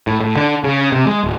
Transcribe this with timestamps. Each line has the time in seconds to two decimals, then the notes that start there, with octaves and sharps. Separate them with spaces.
0.07 A2
0.21 A2
0.37 D3
0.64 C#3
0.92 C3
1.07 G#3
1.24 D1